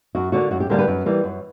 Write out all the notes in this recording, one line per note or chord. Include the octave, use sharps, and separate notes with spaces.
F#2 F#4
D3 G3 A#3 F#4
F#2 F#4
G4
D3 G3 A#3 A#4
B4
F#2
E3 G3 A#3
F#2